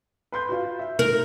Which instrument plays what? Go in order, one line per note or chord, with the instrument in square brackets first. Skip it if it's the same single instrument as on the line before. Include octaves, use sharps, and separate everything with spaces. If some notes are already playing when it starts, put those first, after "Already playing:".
[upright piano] B4 C6 G6
F4 F#4
E5
[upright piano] G#2 [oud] A#4